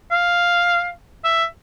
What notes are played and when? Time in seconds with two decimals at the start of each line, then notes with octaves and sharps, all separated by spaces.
0.11 F5
1.24 E5